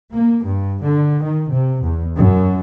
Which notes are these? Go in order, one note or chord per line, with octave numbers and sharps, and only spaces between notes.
A#3
G2
D3
D#3
C3
E2
F#2